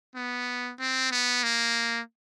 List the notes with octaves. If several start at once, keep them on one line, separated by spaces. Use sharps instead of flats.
B3
C4
B3
A#3